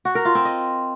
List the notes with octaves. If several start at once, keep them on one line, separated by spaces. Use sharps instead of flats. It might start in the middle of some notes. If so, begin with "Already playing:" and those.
F#4
A#4
F4
C4
D#5